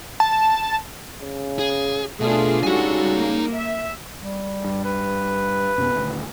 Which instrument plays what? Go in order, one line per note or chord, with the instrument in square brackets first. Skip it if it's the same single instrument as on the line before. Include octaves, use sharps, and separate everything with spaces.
[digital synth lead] A5
[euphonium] C#3
[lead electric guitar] G#4
[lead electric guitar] B2 [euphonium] A3 [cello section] D4 F4 G#4
[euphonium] C#3 [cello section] G3 F#4 A4 [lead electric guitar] D#4 G#5
[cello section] A#3
E5
[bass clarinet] G3
[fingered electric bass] G2
[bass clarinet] B4
[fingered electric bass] F#2 C3 B3
D#1 D2